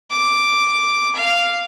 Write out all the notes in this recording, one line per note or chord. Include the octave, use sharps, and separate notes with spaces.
D6
F5